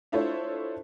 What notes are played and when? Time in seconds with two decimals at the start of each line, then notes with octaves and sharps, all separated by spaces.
0.12 D4 E4 F4 A4 C5 C#5